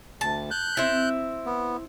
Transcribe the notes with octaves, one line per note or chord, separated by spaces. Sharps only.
D2 A5
F#6 G6
C4 E4
B3